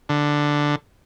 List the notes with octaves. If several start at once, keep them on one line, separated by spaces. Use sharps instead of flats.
D3